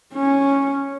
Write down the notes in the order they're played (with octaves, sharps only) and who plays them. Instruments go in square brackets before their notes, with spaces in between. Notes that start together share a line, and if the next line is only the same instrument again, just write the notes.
[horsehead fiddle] C#4